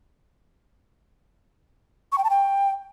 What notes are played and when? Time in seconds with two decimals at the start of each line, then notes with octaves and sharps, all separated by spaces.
2.12 C#6
2.18 G5
2.24 A5
2.30 G5